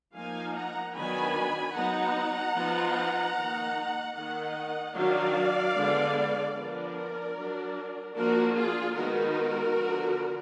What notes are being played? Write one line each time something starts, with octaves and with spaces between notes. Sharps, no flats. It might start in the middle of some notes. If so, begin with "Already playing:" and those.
F3 A#3 D#4 F5 G#5
F#5 A#5
D#3 F#3 B3 D4 G#5 B5
F#3 B3 D#4 F#5 A#5
F3 B3 D#4
D#3 A#3 D#4
D#3 A#3 D#4 D#5 F#5
D#3 F#3 D4 D5 F5
D3 G#3 B3 D4
F3 B3 D4 A#4 D5
F#3 D4
F3 A#3 D4 F#4 A#4
F4 G#4
D#3 G#3 B3 D#4 F#4 A#4
D3 F3 B3